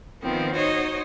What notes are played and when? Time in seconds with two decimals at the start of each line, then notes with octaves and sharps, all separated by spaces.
0.21 D#3 F3 B3 C4
0.54 D#4 F#4 C5 C#5 D#5